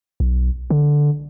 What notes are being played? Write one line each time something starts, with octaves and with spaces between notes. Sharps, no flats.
B1
D3